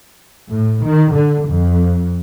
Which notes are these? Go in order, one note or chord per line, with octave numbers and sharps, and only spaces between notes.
A2
D#3
D3
F2